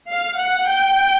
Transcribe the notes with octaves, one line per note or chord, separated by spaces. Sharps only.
F5
F#5
G5